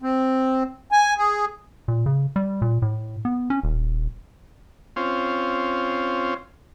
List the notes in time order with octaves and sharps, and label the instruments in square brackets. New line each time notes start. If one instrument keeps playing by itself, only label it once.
[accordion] C4
G#5
G#4
[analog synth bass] A#2
C#3
G3
A#2
A2
B3
C#4
D#1
[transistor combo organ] C4 C#4 F4